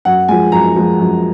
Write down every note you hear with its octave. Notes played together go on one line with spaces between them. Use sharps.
F#2 F#5
F3 G#3 G#5
F#2 A#5
F3 G#3
F#2